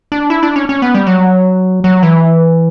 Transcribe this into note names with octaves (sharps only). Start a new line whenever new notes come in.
D4
E4
D4
C#4
C#4
B3
G3
F#3
F#3
E3